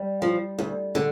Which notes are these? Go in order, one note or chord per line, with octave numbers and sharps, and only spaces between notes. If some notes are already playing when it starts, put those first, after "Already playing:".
Already playing: G3
F3
D2
D3